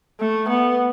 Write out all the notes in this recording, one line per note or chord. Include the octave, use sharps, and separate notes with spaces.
A3
B3